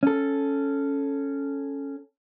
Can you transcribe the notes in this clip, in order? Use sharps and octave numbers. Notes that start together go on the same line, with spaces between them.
C#4 A4